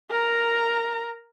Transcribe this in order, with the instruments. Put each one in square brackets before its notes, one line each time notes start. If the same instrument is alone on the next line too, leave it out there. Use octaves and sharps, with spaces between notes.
[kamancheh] A#4 A#5